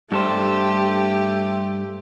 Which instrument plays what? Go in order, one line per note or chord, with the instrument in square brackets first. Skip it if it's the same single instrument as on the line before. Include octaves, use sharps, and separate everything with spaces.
[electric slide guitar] G2 A4 C5 [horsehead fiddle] A3 G4